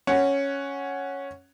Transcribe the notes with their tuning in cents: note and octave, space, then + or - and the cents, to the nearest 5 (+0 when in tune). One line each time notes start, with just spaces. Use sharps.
C#4 +0 F#5 +0